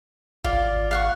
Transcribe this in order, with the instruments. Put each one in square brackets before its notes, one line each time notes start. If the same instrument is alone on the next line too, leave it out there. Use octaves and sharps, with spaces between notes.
[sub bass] G#1 [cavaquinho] F4 D5
[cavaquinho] F5 F#5 C#6